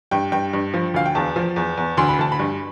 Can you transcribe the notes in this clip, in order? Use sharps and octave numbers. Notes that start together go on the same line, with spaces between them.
G2 G5
G2 G5
G2
F3
D2 F5
G5
E2 A5
F3
E2
E2
D2 C6
B5
D2 A5
B5
G2